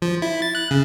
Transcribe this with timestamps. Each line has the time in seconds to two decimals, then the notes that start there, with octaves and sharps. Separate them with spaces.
0.02 F3
0.22 E4
0.42 A6
0.55 F#6
0.71 C#3